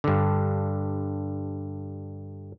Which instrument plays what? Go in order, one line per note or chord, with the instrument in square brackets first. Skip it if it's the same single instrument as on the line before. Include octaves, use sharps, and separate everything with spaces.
[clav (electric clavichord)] G2 D3